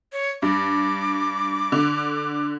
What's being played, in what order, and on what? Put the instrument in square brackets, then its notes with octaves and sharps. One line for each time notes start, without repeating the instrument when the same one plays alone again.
[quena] C#5
[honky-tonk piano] G2 [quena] D6
[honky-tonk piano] D3